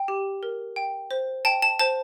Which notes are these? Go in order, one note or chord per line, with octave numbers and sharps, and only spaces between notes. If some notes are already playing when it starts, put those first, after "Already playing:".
Already playing: G5
G4
A#4
G5
C5
G5 A5
A5
C5 A5